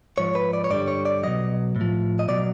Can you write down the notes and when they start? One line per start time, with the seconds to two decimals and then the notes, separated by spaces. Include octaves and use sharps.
0.18 G#2 F3 C#5
0.35 B4
0.53 D5
0.64 C#5
0.70 G2 D3 G3 D5
0.88 C#5
1.05 D5
1.23 B2 F#3 D#5
1.76 A2
1.81 F3
2.19 D#5
2.28 B2 F#3 D5